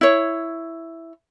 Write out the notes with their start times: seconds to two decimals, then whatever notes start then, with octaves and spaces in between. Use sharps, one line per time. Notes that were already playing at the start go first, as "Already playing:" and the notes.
0.01 E4 C#5